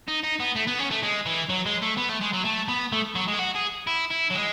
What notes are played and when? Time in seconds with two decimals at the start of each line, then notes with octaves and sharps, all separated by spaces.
0.08 D#4
0.24 D#4
0.40 B3
0.55 A3
0.67 B3
0.79 C#4
0.91 A3
1.03 G#3
1.26 E3
1.49 F#3
1.66 G#3
1.82 A3
1.97 B3
2.09 A3
2.21 G#3
2.33 F#3
2.45 A3
2.68 B3
2.92 A3
3.15 F#3
3.28 G#3
3.34 G#4
3.39 F#4
3.56 G#4
3.87 E4
4.10 E4
4.30 F#3
4.34 G#3